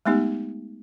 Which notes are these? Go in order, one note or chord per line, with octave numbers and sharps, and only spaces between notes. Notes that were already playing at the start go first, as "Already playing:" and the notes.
G#3 A3 B3 D#4 G4